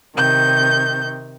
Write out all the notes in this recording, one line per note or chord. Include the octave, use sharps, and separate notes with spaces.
C3 D#3 G6